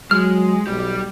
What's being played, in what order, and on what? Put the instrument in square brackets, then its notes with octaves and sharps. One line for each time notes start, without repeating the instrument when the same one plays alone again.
[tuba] F#3 [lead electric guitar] G#3 [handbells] F6
[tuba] B1 [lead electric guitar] G3 G4